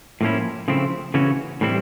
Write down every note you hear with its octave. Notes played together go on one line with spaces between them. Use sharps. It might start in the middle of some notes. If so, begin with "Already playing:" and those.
A2 F3 A#3 C#4 E4
C#3 F3 A3 C4 E4
C#3 E3 A3 C#4 F#4
A2 E3 G3 C4 E4